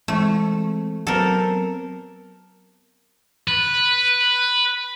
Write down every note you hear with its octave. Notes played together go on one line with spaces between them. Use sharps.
E3 G#3 A3 C4
F#3 B3 C4 A4 A#4
B4